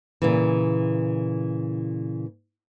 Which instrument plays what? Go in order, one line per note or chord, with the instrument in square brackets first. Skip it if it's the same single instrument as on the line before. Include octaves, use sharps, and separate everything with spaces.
[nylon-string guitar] A#2 C#3 E3